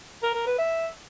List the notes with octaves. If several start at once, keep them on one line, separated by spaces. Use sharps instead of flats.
A#4
A#4
B4
E5